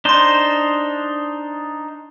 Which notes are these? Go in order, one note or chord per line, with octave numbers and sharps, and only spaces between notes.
D4 D#4 C5 C6 G7